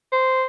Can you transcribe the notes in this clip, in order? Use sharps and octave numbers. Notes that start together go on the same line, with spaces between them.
C5